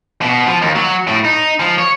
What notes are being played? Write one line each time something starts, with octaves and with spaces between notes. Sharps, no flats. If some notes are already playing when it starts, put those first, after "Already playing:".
B2
F3
D#2
F#3
A2
D#4
F3
C#5